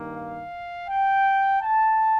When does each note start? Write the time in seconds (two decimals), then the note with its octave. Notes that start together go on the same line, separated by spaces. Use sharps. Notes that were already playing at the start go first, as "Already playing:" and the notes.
Already playing: G2 D#3 A#3
0.15 F5
0.89 G5
1.62 A5